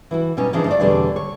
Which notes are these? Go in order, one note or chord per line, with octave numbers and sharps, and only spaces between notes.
E3 E4 F#4
B2 G3 C#4 D#4
C#3 E3 F3 C4 D4 D#4
A3 C5 D5
E2 B2 D3 G3 A3 C4
C#5